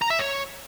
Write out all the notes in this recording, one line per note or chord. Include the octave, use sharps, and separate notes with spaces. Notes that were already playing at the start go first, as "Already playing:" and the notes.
A#5
E5
C#5